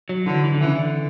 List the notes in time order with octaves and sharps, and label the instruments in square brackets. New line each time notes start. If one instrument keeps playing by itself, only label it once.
[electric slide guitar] F#3
[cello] D3 [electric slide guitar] E3
[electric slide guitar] E3
D3
[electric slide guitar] C#3 [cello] E3
[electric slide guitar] D3